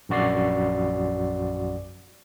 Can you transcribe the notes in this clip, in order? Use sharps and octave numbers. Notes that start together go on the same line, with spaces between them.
A#1 F#2 F#4 D5 C7